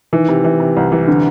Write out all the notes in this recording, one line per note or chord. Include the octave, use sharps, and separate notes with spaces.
D#3 E3
C3
E3
C3
C2
E3
D3